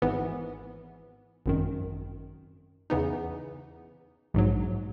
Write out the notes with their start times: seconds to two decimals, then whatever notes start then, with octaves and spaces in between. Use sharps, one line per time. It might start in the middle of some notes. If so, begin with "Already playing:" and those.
0.02 G#1 G#2 E3 B3
1.46 G#1 F#2 D#3
2.90 E2 C#3 E3 B3 D#4
4.34 A#1 G#2 F#3